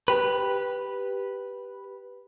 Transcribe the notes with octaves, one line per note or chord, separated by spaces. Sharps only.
G4 B4